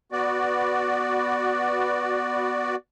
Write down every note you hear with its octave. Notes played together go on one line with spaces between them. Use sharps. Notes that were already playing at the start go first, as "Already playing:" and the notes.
B3 F#4 D5